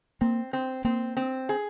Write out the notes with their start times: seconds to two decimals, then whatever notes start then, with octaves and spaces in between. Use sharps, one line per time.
0.21 A#3 C4
0.53 C4
0.84 A#3 C4
1.17 C4
1.49 G#4